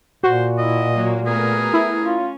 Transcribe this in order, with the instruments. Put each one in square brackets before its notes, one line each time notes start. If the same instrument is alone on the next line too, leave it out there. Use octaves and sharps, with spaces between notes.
[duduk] A#2 [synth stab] F#4 [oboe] C5
[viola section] E4 [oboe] D#5
[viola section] F#3 A#3
[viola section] A3 B3 A#4 [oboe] G#4
[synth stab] E4
[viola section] C#4 [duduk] F4